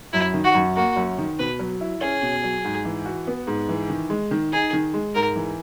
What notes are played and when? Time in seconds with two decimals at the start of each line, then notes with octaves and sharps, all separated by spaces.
0.13 F#2 E4
0.34 D#3
0.44 F#4
0.54 F#2
0.76 A#3 F#4
0.96 F#2
1.18 D#3
1.39 B2 B4
1.59 F#3
1.81 E4
2.01 C#4 G#4
2.22 B2
2.43 F#3
2.65 G#2
2.85 E3
3.05 F#4
3.27 B3
3.47 G#2
3.69 E3
3.90 D#3
4.10 G#3
4.31 D#3
4.53 D#4 G#4
4.73 D#3
4.94 G#3
5.15 G#2 A#4
5.36 E3